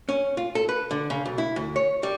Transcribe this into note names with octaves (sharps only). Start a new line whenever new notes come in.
C#4
F4
A4
B4
D3
C#3
B1
E4
D2
C#5
G3